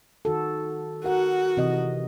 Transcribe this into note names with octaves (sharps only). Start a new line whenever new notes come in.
D#3 F#4 A4
F#4 A#4 F#5
C3 E3 D#5